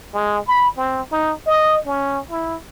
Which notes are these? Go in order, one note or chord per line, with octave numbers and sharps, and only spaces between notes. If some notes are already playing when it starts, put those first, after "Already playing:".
G#3
B5
C4
D#4
D#5
C#4
E4